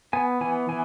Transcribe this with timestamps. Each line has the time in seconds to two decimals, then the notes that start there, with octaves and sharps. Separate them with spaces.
0.13 B3 G#5
0.41 E3 G#5
0.69 E3 G#5